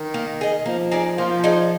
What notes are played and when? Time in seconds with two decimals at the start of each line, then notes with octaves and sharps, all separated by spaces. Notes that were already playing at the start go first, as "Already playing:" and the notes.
Already playing: D#3
0.14 A#3
0.41 D#4 G#4
0.66 F3 A#3
0.91 D#4 G#4 D5
1.18 F3 A#3
1.44 D#4 G#4 D5